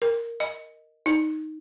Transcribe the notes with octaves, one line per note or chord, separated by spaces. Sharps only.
A#4
D#5
D#4